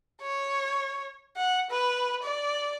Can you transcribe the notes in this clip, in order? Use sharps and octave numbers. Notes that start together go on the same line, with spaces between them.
C#5
F#5
B4
D5